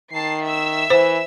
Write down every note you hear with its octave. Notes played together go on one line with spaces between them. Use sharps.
D#3 A5 C7
E5 E6
E3 C5